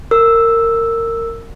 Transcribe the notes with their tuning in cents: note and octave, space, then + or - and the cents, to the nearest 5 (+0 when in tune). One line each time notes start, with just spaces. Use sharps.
A#4 -20 E6 +0